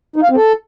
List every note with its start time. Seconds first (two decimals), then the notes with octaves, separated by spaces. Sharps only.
0.16 D#4
0.23 F5
0.30 C4
0.37 A4